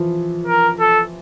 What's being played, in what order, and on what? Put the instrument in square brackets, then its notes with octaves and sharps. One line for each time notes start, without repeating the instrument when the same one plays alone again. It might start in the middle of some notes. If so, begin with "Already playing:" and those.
Already playing: [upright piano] E3 F3
[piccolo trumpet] A#4
A4